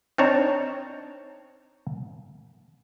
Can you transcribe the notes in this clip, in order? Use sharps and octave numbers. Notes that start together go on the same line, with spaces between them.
C4 D4 D#4 C#5 A5 A#5